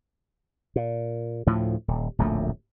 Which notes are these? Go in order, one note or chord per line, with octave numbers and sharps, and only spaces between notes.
A#2
D2 A2 F3
D#1
D1 A#1 F#2 A3